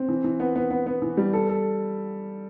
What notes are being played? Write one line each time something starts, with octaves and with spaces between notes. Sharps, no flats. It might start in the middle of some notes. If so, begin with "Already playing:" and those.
Already playing: C4
E3
E3
B3
B3
B3
B3
E3
G3
A4
A4